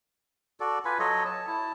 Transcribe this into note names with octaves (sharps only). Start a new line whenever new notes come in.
F#4 A4 D5
F4 B4 G#5 B5
F#3 A4 C#5 D#5
A5
E4 A5